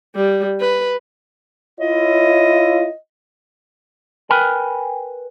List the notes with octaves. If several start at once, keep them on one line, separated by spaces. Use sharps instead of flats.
G3
B4
E4 F4 C#5 D#5
A#4 B4 G5 G#5 B5